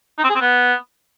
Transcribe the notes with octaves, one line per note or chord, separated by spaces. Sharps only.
D#4
C4
G#4
C4
B3